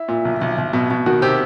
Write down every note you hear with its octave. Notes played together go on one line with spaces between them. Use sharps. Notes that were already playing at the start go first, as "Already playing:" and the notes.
Already playing: E4
A#2
B1
B1
B1
B2
B2
D#3 F#4
C3 G4